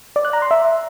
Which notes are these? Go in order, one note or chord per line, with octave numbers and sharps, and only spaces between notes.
D5
F#6
A#5
C6
E5